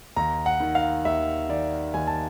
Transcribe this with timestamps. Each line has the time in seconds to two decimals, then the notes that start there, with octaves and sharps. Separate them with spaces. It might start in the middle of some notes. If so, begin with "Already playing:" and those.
0.16 D#2 A#5
0.46 F#5
0.60 D#3
0.75 F5
1.05 D#2 E5
1.49 D#3 D5
1.94 D#2 G#5
2.07 A5